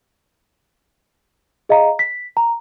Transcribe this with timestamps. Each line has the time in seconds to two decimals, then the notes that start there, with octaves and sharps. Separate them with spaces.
1.69 G#4 D#5 F5 A#5
1.99 B6
2.37 A#5